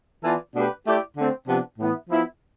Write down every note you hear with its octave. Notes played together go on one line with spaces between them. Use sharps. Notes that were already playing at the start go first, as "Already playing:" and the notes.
E3 B3 F4 A4 D5
B2 A3 D4 G4 B4
A3 E4 G4 D5
D3 A3 C4
C3 F3 B3 D4
A2 E3 B3 E4
F3 B3 E4